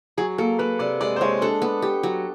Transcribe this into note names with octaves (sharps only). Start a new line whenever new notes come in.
F#3 G#4
A#3 A4
A#3 B4
C3 D5
G#3 D5
C5
G#3 C#5
D4 A4
B3
G4
F#3